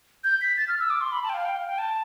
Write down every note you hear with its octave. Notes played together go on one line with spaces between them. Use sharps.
G6
B6
A6
F6
E6
D6
C6
B5
A5
G5
F5
G5
F5
G5
A5